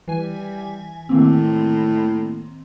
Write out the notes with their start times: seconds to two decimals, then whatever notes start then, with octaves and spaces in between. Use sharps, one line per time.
0.08 E3 G3 G#5
1.09 A2 D#3 A#3 C4